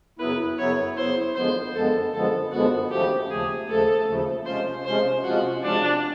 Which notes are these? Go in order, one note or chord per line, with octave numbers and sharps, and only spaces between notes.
F#2 C#3 F#3 B3 E4 B4
F#2 C#3 F#3 B3 E4 C#5
F#2 C#3 F#3 B3 E4 C5
F#2 D3 F3 G#3 B3 C5
F#2 D3 F3 G#3 B3 A4
F#2 D3 F3 G#3 B3 A4
F#2 D3 F3 G#3 B3 F#4
D#2 C#3 F3 A3 G4
D#2 C#3 F3 A3 G#4
D#2 C#3 F3 A3 A4
D#2 C#3 F3 A3
C3 F3 G#3 C#4 F4 C5
C3 F3 G#3 C#4 F4 C5
C3 F3 G#3 C#4 F4 F#4
C3 F3 G#3 C#4 D4 F4